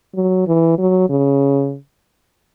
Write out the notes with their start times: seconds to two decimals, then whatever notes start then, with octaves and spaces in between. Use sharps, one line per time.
0.15 F#3
0.47 E3
0.79 F#3
1.10 C#3